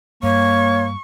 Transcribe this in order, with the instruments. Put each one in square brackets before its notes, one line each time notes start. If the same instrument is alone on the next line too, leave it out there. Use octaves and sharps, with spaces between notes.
[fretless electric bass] G2 [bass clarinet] A#3 [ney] C#5 [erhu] C#6